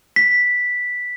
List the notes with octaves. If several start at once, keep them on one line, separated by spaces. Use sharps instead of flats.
B6